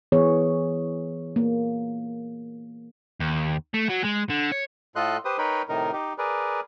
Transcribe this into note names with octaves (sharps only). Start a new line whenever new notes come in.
E3 B3 G#4 C#5
A#3
D#2
A3
F#3
G#3
D3
C#5
A2 F4 A4 D#5 C6 F#6
G4 B4 C5 D#6
D#4 A#4 B4 C#5 G5 B5
A2 C3 D#3 D#4 A#4
D#4 G4
G#4 A#4 B4 D5